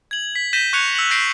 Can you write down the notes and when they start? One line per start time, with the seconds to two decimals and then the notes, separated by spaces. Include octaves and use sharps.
0.11 G#6 F#7
0.36 B6
0.53 G6 A#6 B6 D#7 E7 G7
0.73 C#6 F#6 G#6 C#7 F7
0.95 E6 C#7 F#7
1.11 F#6 G6 A#6 C7 D7